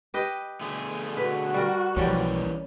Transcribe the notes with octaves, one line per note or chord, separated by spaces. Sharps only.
G4 B4 D#5
D3 A3 G#4
F#4 B4
G3 A#4
B1 E3 F3 G3 A#3 C#4